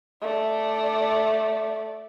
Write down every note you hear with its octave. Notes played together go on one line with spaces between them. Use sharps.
A3 D5